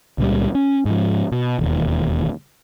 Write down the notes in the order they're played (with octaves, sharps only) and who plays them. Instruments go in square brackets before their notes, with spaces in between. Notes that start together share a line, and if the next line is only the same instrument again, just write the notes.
[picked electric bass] C#2 A#2 C#3 G3
C#4
G#2 F3
B2
E1 D#2